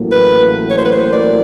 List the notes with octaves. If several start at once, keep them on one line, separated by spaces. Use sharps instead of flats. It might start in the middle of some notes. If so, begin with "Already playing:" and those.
Already playing: A1 A2 F#3 A#3
B4
C#5
C5
B4
C5
D5